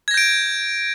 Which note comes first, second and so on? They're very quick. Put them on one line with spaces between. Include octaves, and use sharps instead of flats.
G#6 A#6 G6 D7